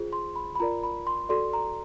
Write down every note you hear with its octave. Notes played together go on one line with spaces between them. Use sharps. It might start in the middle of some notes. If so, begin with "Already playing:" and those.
Already playing: F4 G#4 C5
C6
B5
B5
F4 A#4 D5 A#5
B5
C6
F#4 A4 D5 C6
A#5